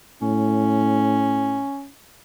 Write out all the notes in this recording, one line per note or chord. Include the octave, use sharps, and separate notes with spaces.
A2 C#4